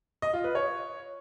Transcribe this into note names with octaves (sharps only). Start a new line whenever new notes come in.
D#5
F4
B4
C#5